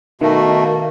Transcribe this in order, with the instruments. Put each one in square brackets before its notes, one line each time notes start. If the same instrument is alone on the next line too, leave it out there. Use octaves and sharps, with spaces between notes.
[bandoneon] B2 A3 [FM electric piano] D#3 [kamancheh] A#3